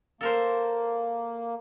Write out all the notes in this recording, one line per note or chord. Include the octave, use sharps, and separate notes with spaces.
A#3 A4 A#4 C5